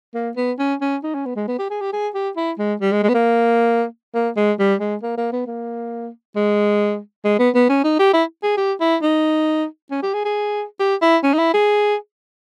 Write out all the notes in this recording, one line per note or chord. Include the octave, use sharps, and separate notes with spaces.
A#3
B3
C#4
C#4
D#4
C#4
B3
G#3
B3
G4
G#4
G4
G#4
G4
E4
G#3
G3
G#3
G#3
B3
A#3
A#3
G#3
G3
G#3
A#3
A#3
B3
A#3
G#3
G#3
B3
B3
C#4
D#4
G4
E4
G#4
G4
E4
D#4
C#4
G4
G#4
G#4
G4
E4
C#4
D#4
E4
G#4